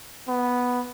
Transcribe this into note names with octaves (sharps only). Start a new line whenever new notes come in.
B3